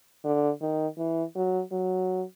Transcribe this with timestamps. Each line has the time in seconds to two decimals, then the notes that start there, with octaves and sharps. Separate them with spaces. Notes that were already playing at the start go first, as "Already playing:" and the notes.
0.24 D3
0.61 D#3
0.98 E3
1.35 F#3
1.72 F#3